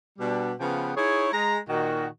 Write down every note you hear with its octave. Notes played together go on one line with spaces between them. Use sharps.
B2 G3 D4
C#3 F3 B3 G4 B4
D#4 E4 G#4 C#5
G#3 A#5
A#2 D#3 F#4